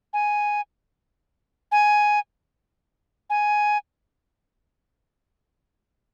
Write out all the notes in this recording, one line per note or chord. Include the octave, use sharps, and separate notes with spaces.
G#5
G#5
G#5